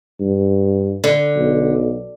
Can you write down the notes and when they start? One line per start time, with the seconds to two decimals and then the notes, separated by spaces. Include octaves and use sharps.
0.20 G2
1.04 D3
1.36 B1